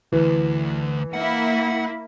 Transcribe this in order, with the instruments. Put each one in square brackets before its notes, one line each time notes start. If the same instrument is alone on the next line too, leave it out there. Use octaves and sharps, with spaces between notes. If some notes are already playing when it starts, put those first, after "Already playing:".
[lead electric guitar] D2 [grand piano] E3
[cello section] A#3 E4 [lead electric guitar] F#5